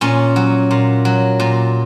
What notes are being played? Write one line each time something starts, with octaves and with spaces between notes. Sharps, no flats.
A#2 C#4
F#3
A#2
F#3
A#2